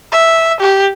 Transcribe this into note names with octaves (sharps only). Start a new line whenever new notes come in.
E5
G4